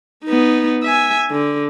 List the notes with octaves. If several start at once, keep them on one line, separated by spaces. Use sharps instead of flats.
B3 D#4
E5 G#5
D3